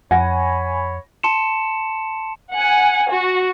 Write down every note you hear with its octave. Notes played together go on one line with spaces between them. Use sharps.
F2 C#5 F#5 G#5 B5 A#6
A5 C6 C#7 E7
F#5 G#5
F#4